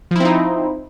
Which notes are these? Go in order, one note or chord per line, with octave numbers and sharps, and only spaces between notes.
F3 C4 D#4 E4